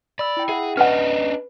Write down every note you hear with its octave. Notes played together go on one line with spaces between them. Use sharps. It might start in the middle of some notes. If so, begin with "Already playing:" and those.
D5 B5 E6
E4 G5
G#4 E5 F#5
C#4 D4 B4 D#5 F#5 F6